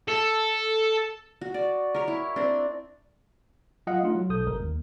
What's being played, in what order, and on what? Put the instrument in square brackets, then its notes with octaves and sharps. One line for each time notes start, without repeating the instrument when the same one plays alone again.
[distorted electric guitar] A4
[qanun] F#4
D5
A#4 C#5
E4
C4 D4
[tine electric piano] F#3 F4 D#5 F5 F#5
A3 D4 D#4 F4
F#3
B1 A4 D#6 G6
G1 C2 G#3 A#4
D#2